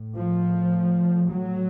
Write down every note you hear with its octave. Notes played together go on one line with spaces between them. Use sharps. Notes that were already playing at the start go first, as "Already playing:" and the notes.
Already playing: A2
F3
F#3